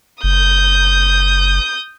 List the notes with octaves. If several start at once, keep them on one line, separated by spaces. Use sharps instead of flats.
F#1 D#6 G6